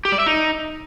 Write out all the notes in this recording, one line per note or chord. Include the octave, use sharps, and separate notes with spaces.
G4
D5
E5
D#4